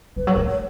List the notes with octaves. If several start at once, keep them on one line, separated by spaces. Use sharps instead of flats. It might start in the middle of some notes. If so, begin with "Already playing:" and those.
F3 B4
F#3
A3 A#4
C#5